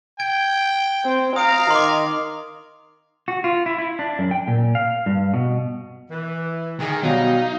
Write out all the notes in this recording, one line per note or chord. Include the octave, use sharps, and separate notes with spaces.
G5 G#6 D7
C4
F5 A#5 D#6 D7
D#3 C6 D6
F#4
F4
E4
E4
D4
F#2
G5
A#2
F5
G2
B2
E3
D#3 G#4
B2 F#3 G3 D#4 F5